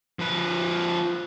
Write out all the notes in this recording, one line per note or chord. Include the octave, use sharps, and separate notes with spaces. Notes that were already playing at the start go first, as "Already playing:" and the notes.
F3 B4